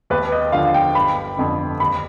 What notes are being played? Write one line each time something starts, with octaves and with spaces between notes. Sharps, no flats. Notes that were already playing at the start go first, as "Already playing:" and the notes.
D#2 B4
D#5
D3 F3 F5
G5
G1 B5
F2 D3
D#2 B5